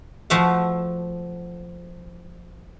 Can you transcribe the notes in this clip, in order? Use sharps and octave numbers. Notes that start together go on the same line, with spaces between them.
F3 A3 F#4 E5 F5